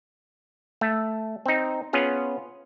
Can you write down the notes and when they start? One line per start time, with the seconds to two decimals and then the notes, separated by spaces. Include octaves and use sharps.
0.81 A3
1.46 C4 D#4
1.93 B3 C#4 F4 G#4 F5